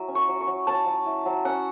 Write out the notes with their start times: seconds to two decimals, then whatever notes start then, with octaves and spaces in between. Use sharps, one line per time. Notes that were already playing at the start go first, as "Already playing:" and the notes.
Already playing: F#3 E4
0.08 C#4
0.15 C#6
0.28 F#3
0.41 C#6
0.47 F#3
0.67 C#4 A5
0.86 F#3
1.06 E4
1.26 F#3
1.45 C#4 F#5